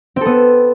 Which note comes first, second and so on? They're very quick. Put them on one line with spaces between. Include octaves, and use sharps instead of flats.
C4 A4 B3